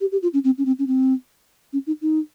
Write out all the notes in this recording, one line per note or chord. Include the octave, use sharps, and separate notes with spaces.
G4
G4
F4
C#4
C4
C#4
C4
C#4
C4
C#4
D#4
D#4